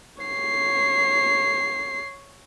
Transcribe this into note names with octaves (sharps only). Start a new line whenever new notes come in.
C#5 C7